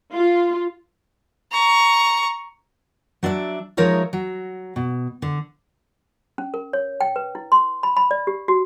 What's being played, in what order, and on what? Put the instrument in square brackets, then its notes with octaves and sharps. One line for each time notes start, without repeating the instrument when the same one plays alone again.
[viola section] F4
[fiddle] A#5 C#6
[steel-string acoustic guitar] F#3 D4 D5 E5
F3 G#3 D#4 A#4 C#5 E5
F#3
B2
D3
[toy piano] C#4
A#4
C#5
G5
B4
E4
C6
B5
B5
D5
G4
F#4